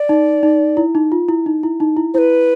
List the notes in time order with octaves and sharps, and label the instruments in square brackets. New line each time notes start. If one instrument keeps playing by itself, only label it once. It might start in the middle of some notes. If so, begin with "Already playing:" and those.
Already playing: [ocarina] D5
[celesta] D#4
D#4
E4
D#4
F4
E4
D#4
E4
D#4
E4
[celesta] E4 [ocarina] B4 C5